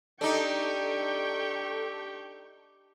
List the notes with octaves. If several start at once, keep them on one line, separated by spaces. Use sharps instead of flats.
D4 D#4 G4 A4 G5 C#6